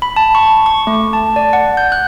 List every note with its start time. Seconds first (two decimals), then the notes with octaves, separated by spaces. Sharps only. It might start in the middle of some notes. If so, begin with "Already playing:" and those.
0.02 B5
0.16 A5
0.35 C#6
0.66 C#6
0.87 A3
1.13 A5
1.36 D5
1.53 F#5
1.77 G6
1.92 F#6